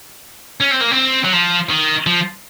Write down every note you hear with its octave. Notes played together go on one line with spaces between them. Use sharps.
C#4
C4
A#3
C4
F#3
F3
D#3
F3